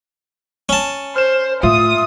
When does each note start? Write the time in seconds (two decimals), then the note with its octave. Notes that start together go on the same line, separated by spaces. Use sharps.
0.69 C#4 A5
1.16 C5 F6 E7
1.63 A2 F4 E5 D#6